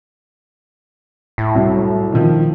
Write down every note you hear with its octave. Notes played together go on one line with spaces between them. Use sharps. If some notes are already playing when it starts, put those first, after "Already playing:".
A2
C2 F#3
D#3 F3